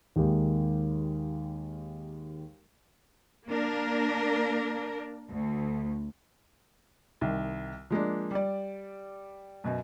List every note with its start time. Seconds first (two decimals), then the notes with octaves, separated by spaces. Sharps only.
0.16 D#2 D#3 G#3 A#3 G4
3.48 A#3 D4 A#4
5.32 D2
7.21 C2 D#3
7.90 F3 G#3 A#3 D4
8.31 G3 D5
9.64 F#2 B2